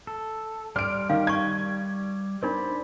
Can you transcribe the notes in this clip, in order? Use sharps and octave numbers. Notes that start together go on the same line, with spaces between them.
A4
G3 D5 C6 F6 D7
D#3 F5
A5 C#6 G#6
D4 D#4 A#4 C5 D5 B5